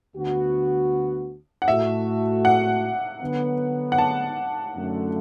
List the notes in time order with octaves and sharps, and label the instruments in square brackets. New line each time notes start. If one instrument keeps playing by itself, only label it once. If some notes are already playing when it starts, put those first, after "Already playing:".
[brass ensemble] D2 D3 B3 F#4
[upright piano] F#5
[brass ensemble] A2 A3 F#4 [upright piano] E5
[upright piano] F#5
[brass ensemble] D3 F#3 B3
[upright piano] F#5
A5
[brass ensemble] F#2 D3 A3